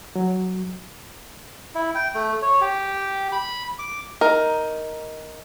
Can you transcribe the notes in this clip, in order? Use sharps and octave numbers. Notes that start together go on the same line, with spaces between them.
F#3
E4
G5
A3
C#5
G4
B5
D6
D#4 A#4